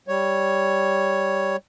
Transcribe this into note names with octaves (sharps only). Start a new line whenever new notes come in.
G3 C#5